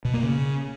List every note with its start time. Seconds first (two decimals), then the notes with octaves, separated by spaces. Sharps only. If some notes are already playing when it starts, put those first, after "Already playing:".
0.05 B2
0.14 A#3
0.23 C#3